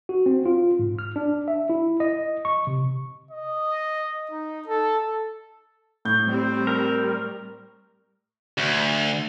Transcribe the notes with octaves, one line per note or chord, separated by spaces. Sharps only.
F#4
C4
F4
G#2
F6
D4
E5
E4
D#5
C#6
C3
D#5
D#4
A4
A2 G6
G3 C4
A#4
D2